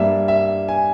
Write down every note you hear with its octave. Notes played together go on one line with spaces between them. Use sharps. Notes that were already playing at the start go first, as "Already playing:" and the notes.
Already playing: G2 G3 A#3 E5
E5
G#5